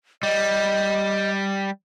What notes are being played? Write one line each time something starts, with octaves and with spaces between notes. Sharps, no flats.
G3 D#5